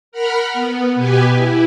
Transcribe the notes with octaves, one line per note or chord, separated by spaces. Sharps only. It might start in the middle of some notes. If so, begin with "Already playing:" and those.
A#4 F#5 B5 F6
B3
B2 G4 B4 G#5
E4